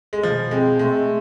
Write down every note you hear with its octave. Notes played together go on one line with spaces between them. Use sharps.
G#3
B2 F3
G#3 C4
G#3 A3